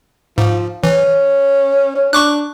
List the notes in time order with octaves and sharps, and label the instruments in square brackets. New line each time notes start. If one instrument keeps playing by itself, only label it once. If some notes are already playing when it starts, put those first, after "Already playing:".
[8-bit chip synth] G#2 [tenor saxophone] F3
[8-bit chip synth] E3 [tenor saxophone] C#4
[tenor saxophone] C#4
[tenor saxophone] D4 [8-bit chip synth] C#6 D6 F#6